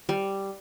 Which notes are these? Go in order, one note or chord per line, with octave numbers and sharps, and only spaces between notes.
G3